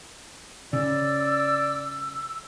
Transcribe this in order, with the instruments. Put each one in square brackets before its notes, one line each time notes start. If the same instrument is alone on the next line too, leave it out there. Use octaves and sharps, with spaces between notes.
[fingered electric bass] C#3 [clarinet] D5 [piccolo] E6